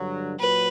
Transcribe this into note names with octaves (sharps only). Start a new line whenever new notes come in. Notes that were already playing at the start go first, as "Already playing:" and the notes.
Already playing: G2 D3 F#3
A#2 F#3 B4